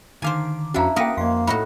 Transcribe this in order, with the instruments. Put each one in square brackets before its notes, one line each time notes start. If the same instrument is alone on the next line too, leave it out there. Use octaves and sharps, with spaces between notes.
[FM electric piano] D3 D#3 D6 [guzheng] C5 F5 G#5
[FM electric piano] F2 F#4 [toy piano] C#4 F5 A#5 [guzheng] D4 E4
[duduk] A#3 [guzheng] F#4 A#4 B4 [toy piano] F5 G5 [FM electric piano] D#6
[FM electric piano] F2 C6 [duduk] A#3 [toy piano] D#5 F5
[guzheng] A2 D#4 F#4 [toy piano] B5